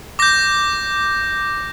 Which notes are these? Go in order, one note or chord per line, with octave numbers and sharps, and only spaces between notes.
D6 G6 A#6